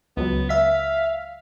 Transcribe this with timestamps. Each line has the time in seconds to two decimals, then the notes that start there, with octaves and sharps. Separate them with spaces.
0.17 C#2 F#3 B3
0.49 E5 F5 B6